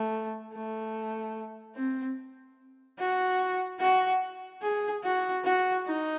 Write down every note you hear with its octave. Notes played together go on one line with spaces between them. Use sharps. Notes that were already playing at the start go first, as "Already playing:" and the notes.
Already playing: A3
A3
C4
F#4
F#4
G#4
F#4
F#4
D#4